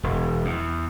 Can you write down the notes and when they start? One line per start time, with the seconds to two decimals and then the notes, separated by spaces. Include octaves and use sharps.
0.03 E1
0.45 E2